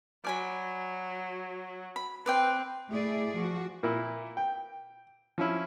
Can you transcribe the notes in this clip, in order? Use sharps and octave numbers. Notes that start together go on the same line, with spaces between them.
F#3 D5 G#5 B5
B5
C4 B4 D5 G5
A3 E4 G#4 D5
F3 F#4
A#2 A#3 E4
G5
F3 C#4 E4